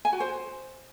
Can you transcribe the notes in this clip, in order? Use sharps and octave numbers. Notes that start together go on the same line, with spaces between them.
G#5
F#4
C5